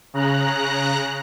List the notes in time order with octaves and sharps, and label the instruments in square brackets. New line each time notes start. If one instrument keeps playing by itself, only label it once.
[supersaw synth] C#3 A#5 F#6